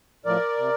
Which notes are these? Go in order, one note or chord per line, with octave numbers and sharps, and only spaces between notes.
A2 F3 A#4 D5
C3